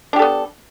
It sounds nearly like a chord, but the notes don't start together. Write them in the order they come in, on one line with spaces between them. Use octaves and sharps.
D4 G4 A4 B3